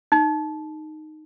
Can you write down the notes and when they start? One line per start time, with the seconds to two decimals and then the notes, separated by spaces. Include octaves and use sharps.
0.12 D#4